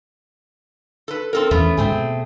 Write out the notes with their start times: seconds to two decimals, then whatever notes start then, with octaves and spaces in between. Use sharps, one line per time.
1.08 A4 B4
1.33 C4 A4 A#4
1.51 E2 E3 A3 B3 C#4
1.77 D2 G#2 G#3 A3 C4 G#4
1.91 B2